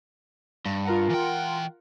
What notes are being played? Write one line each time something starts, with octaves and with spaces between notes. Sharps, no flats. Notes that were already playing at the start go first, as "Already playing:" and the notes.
G2
F4 A#4 F#5
E3 G5